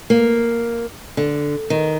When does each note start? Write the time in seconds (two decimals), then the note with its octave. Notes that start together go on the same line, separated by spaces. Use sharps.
0.10 A#3
1.17 D3
1.70 D#3